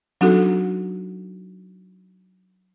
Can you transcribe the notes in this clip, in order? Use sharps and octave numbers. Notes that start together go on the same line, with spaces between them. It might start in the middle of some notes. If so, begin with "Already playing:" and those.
F#3 C4 D4 D#4 F#4 A4